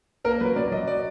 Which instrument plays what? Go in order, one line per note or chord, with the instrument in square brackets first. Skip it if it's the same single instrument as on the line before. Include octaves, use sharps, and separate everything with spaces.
[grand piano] A#3 A#4
F#3 B4
F#3 D5
F#3 D#5
D5